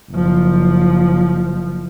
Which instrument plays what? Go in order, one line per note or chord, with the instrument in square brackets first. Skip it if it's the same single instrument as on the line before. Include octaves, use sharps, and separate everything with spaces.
[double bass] F#1 F3